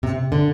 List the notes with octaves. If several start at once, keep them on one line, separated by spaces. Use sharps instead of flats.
C3
D3